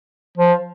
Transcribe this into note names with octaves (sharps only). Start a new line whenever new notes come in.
F3